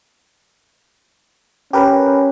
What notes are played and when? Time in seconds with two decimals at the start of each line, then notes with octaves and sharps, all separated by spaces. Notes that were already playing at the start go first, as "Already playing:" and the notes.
1.73 C#4 G4 A#4 B4